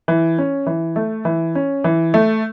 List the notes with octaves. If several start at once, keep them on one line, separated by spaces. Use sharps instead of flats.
E3
C#4
E3
A3
E3
C#4
E3
A3